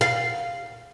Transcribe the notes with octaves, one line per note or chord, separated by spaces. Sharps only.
F5